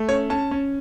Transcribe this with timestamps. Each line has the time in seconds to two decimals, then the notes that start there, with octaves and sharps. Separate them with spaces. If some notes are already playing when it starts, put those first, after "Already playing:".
Already playing: A3
0.08 C#4 C#5
0.30 C#4 A5
0.51 C#4